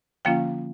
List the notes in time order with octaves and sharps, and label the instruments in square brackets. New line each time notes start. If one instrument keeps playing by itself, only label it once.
[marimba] D3 F3 A#3 C#4 F4 F5 G5